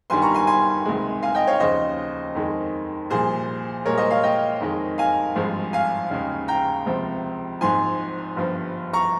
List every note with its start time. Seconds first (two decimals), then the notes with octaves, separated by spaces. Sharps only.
0.10 G1 G2 D#3 G3 G#5 C6
0.22 A#5 C#6
0.34 G#5 C6
0.47 G#5 C6
0.85 C#2 C3 D#3 G#3
1.23 F5 G#5
1.35 D#5 G5
1.47 C#5 F5
1.60 D#2 C#3 F3 C5 D#5
2.35 F2 D#3 G#3
3.10 C2 A#2 F3 G#4 C5
3.85 C2 A#2 G#3 A#4 C#5
3.98 C5 D#5
4.11 C#5 F5
4.23 D#5 G5
4.61 F2 D#3 G#3
4.98 F5 G#5
5.36 G#1 G2 F3 G#3
5.73 F5 G#5
6.11 D#2 C#3 G#3
6.48 G5 A#5
6.86 C#2 C3 F3
7.61 G#1 G#2 F3 G#5 C6
8.36 G1 G2 F3
8.93 A#5 C#6